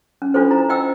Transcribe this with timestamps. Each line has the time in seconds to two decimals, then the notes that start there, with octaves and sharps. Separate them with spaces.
0.22 C#4
0.34 C#4 D4 F4 A4 C5
0.51 E4 A#5
0.69 C5 D#5 G5 B5 E6